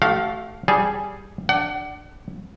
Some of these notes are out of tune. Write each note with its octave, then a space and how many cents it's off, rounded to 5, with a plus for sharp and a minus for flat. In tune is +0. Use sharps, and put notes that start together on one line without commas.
A3 -10 F#4 +45 F5 +10
G3 +0 G#4 +0 A5 +15
D4 +5 F#5 +30